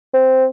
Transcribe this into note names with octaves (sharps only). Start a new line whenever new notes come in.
C4